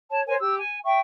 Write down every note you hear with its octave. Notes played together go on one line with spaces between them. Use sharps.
C#5 A5
A#4 C5 C#5 G#5
G4 E6
G#5
E5 G5 C#6